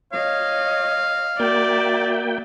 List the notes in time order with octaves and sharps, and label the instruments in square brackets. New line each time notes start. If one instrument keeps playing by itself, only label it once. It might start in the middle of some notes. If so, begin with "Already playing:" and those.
[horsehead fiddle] C#5 D#5 [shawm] F5
[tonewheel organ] A#3 G5 [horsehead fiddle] F#4 E5 [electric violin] D5